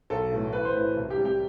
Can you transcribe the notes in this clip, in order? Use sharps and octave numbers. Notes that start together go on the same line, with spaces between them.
B1 A4
A2 E3 A3
A1 B4
C5
A2 E3 B4
C2
G4
C3 G3
G4